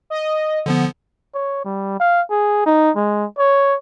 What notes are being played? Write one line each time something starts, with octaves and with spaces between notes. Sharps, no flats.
D#5
D3 F3 B3
C#5
G3
F5
G#4
D#4
G#3
C#5